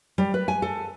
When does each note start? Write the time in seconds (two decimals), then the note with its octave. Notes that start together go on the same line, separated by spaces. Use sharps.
0.18 G3
0.34 B4
0.48 G#5
0.62 A4